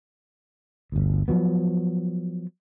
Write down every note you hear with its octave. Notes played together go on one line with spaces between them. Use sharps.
G1 D2
F3 F#3 B3